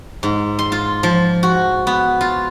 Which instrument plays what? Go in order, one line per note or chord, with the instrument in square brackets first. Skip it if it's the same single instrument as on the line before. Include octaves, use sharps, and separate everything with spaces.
[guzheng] G#2
C6
F4
F3
F#4
B3
F4